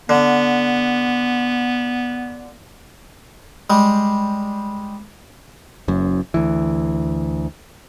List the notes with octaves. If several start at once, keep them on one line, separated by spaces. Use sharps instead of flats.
D3 B3
G3 G#3
F#1 F#2
D2 E3